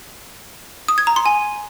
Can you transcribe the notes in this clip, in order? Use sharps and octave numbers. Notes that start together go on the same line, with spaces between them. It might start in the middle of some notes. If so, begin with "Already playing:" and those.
D#6
G#6
A#5
C6
G#5